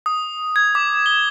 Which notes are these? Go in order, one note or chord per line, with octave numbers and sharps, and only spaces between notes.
D#6
G#6
D6
G7